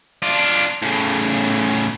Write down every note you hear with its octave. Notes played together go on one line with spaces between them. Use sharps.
D4 F4
A2 C#3